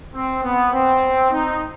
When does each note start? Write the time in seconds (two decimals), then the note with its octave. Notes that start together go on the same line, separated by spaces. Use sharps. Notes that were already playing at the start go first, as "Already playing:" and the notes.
0.15 C4
0.43 B3
0.72 C4
1.32 D#4